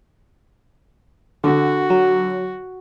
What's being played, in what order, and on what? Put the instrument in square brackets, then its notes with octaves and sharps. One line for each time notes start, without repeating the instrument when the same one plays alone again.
[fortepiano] D3 [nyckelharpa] F#4
[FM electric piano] F#3